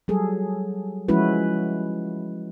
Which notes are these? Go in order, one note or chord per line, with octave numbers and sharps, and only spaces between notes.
F#3 G3 G#4 A4
F3 G#3 C#4 E4 F#4 B4